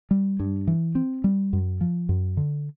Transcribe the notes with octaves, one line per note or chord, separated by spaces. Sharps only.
G3
G2
E3
C4
G3
F#2
F3
F#2
D3